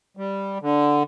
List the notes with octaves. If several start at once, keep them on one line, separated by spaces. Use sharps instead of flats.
G3
D3